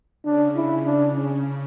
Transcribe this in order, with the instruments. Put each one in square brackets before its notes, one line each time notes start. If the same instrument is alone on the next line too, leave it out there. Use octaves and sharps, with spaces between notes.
[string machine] C#3 [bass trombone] D4
[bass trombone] E4
[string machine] C#3 [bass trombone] D4
[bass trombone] C#4